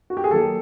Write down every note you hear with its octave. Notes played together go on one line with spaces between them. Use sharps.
F#4
G4
G#4
D#3 F#3 A#3 G4 A4